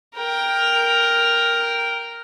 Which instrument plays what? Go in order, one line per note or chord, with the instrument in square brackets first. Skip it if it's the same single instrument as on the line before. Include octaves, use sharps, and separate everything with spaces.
[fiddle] A#4 G5